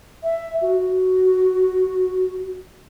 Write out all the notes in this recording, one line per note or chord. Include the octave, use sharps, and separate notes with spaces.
E5
F#4